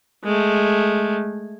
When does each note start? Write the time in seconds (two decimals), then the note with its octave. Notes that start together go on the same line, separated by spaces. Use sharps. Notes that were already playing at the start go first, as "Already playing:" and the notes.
0.24 G#3 A3